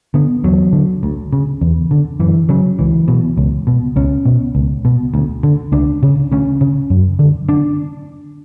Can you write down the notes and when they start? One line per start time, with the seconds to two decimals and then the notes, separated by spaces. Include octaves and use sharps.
0.14 D3 B3
0.44 E2 F#3
0.73 D3
1.03 D2
1.33 C#3
1.61 E2
1.91 D3
2.20 F#2 E3
2.49 C#3 F#3
2.79 C#2 E3
3.08 B2
3.38 C#2
3.67 B2
3.96 C#2 C#4
4.26 B2
4.55 C#2
4.85 B2
5.14 D2
5.43 D3
5.72 C#2 D4
6.03 C#3
6.32 D2 C#4
6.61 C#3
6.90 F#2
7.19 D3
7.49 D4